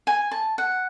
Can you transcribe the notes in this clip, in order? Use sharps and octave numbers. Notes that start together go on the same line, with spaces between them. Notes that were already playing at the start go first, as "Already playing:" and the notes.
G#5
A5
F#5